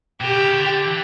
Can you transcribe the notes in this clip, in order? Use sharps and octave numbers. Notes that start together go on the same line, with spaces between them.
B2 G4
C#3
C#3
D3
E3